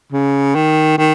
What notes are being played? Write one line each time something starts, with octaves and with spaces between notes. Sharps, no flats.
C#3
D#3
D#3